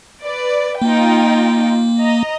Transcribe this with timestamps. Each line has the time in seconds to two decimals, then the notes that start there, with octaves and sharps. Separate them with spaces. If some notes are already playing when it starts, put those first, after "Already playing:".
0.24 B4 D5
0.82 A#3 D#4 F4 G5
2.00 D#5 A#5